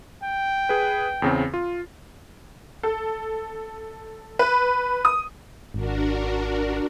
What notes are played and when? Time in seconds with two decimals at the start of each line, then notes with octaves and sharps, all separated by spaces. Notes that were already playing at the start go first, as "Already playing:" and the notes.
0.24 G5
0.69 G#4 B4
1.22 E2 C#3 C4
1.54 F4
2.83 A4
4.39 B4
5.05 D#6
5.74 G#1 D4 F#4 A#4